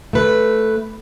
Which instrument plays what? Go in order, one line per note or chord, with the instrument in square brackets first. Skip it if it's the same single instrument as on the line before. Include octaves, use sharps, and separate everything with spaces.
[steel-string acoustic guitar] A3 B4